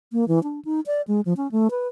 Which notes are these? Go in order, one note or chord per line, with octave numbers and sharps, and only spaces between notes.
A#3
E3
D4
D#4
D5
G#3
F3
C#4
A3
B4